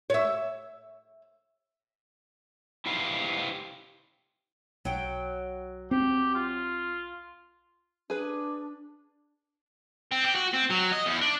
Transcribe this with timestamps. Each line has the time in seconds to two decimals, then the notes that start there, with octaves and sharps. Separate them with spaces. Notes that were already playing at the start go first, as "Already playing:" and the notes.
0.10 C#5 E5
2.86 E4 G4 B4 C5 F5
4.85 B1 F#3 G5
5.91 C4 G4
6.35 F4
8.10 D4 G#4 B4
10.12 C4
10.24 G4
10.36 F#4
10.54 C4
10.70 F#3
10.92 D#5
11.06 E2
11.21 D4